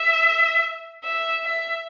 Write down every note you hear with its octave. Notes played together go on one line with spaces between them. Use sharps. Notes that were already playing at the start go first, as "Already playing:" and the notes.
Already playing: E5
E5
E5